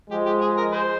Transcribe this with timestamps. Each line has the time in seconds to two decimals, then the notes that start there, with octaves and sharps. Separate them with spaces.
0.10 F3 G#3 G4
0.26 G4
0.41 G#4
0.58 A#4
0.73 G#4 C5